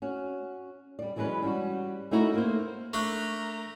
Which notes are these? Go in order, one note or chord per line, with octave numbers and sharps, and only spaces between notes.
C#4 F#4
G3 D5
E3 F#3 G#3 C#4 B4
G3 C#4 F#4
A3 C#4 D#4 E4 F#4 A#4
A#3 C5
A3 D4 A#4 B5 C#6